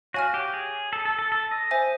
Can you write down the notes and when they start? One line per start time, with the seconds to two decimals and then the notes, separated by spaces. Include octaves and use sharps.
0.14 F#4 C#5 F5 G#5 C#6 F6
0.34 G4
0.54 G#4
0.93 A4
1.05 A4
1.19 A4
1.32 A4
1.51 D#5
1.71 C5 E5 G#5